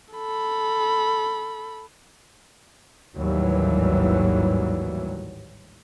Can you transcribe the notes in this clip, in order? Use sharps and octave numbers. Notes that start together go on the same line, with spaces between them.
A4 B5
A1 D#2 G#2 E3 F#3 G3